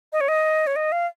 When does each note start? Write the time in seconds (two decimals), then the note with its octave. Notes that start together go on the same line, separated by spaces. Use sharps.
0.13 D#5
0.21 C#5
0.28 D#5
0.67 C#5
0.76 D#5
0.92 F5